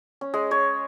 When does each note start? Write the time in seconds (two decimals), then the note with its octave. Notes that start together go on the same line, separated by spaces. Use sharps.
0.21 C#4
0.34 G#3
0.51 C#5